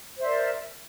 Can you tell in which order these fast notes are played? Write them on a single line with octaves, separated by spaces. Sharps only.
C5 E5 D5 A#4